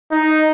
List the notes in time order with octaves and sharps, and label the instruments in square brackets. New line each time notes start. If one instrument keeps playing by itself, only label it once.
[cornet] D#4